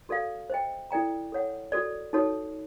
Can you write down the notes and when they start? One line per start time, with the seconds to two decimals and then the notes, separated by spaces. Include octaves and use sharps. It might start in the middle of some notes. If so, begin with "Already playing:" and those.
0.09 F#4 A4 D5 F5
0.50 C5 D#5 G5
0.91 E4 A4 D5 G5 A#5
1.32 A4 C#5 F#5
1.72 F#4 A4 D5
2.13 D#4 F#4 A4 C#5